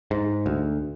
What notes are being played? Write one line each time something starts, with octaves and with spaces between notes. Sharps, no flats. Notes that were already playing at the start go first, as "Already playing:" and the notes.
G#2
D2